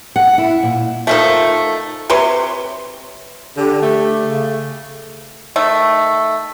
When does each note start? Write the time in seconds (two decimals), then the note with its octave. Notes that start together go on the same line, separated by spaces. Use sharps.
0.16 F#5
0.38 E4
0.63 A#2
1.07 D#3 F3 A3
2.10 C3 B4 C#5 C6
3.57 D3 G4
3.82 A3
4.22 C#3
5.56 D#3 A3